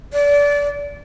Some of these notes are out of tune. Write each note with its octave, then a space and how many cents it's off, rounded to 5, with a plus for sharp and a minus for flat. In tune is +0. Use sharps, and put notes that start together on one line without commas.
D5 -25